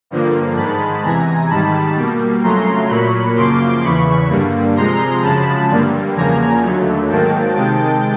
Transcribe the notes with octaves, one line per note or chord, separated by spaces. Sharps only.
G2 D3 F3 A#3
G#2 D#3 G#3 A5 B5
E2 C3 E3 G#5 A#5
G#2 D#3 G3 A5 B5
B2 G3 A#3
F2 C#3 F#3 A3 A#5 C6
A#2 F#3 A#3 B5 C#6
F#2 C#3 F3 A#3 C6 D6
E2 C#3 E3 B5 C#6
G2 D3 G3 A#3
C3 F3 G#3 A#5 C6
F#2 C#3 F3 G#3 A5 B5
G2 D3 G3 A#3
E2 C#3 F3 A#3 G#5 A#5
D#2 D3 F#3 A3
G#2 D#3 F#3 A#3 G5 A5
C3 D#3 G#3 G5 A5